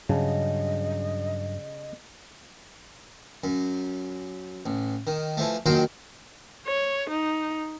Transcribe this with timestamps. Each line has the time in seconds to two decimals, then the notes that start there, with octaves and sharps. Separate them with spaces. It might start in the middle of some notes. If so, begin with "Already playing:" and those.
0.09 G2 C#3 F#3 D4 D#5
3.44 F#2
4.66 A1
5.07 D#3
5.37 E3 F3 A3
5.66 A#1 D#3 F#3 F#4 G5 C6
6.67 C#5
7.10 D#4